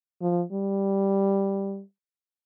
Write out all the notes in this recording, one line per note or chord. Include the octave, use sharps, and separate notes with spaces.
F3
G3